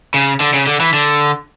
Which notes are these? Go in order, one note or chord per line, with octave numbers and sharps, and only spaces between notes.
C#3
D3
C#3
D3
E3
D3